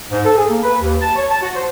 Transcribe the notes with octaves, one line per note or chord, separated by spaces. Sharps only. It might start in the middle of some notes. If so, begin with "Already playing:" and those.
G#2
A4
G#4
A#3
B4
D#2
A5
C#5
A5
F#4
C5